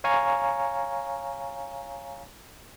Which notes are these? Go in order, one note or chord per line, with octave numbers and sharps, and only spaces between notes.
C#5 F5 G#5 A#5 C#6